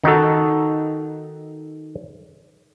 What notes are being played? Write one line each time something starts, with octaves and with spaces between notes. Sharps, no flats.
D#3 D#4 F#4 A4